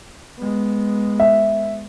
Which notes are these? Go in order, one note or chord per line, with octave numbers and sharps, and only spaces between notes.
G#3 B3
E5